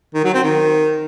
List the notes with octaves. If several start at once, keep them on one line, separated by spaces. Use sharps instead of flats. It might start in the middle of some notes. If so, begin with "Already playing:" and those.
D#3
F#3
C4
D#3